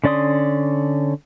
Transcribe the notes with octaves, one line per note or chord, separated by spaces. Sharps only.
D3 C#4 D5 C6 D#6